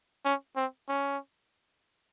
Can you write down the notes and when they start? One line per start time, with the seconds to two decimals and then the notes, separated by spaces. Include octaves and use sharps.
0.25 C#4
0.56 C4
0.89 C#4